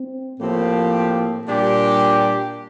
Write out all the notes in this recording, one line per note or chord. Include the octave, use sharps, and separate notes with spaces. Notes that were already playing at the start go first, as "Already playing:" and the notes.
Already playing: C4
A2 F3 A#3 C4 G4
A#2 G3 D4 G4